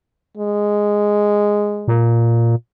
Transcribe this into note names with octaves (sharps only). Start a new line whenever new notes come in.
G#3
A#2